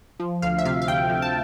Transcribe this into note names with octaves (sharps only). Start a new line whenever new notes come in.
F3
D2 F5
E5
C3 F5
F5
D2 G5
F3
A5